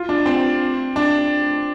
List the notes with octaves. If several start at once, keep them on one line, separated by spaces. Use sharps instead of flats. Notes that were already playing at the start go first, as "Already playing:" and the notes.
Already playing: F4
D4
C4
D4